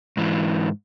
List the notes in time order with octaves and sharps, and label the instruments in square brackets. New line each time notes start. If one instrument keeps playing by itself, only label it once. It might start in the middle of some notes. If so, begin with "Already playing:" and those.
[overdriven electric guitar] G#2 E3